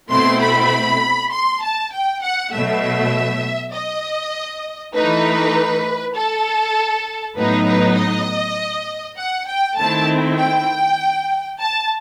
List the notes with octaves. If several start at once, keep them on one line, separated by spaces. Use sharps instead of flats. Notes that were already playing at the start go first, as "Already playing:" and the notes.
B2 A3 C4 E4 C6
B5
C6
A5
G5
F#5
B2 F#3 A3 E5
D#5
E3 A3 D#4 B4
A4
A2 F#3 B3 D#4 B4
B4
D#5
F#5
G5
D#3 A3 C4 E4 A5
G5
A5